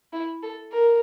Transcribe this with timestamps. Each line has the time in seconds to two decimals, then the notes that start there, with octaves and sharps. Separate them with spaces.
0.13 E4
0.43 A4
0.72 A#4